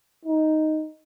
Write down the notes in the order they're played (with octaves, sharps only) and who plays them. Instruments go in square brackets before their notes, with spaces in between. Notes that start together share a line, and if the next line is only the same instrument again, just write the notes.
[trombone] D#4